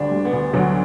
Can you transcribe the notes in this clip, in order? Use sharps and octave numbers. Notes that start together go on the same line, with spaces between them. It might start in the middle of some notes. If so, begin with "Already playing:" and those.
Already playing: D2 G3 D4
G3
B3
D2
D2 F#3